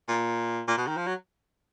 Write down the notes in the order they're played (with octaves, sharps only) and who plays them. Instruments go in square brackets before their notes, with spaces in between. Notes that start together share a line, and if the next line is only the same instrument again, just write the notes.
[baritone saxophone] A#2
A#2
B2
D#3
F3
F#3